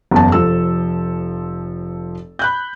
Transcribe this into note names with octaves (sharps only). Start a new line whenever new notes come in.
F#1 E2 A5
F1 F3 A4 E6
B5 F#6 G6